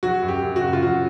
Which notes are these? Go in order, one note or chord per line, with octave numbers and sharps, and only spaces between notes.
F#3 F#4
F#2
G4
F#2
F#4
C#3
F4
F#3 F#4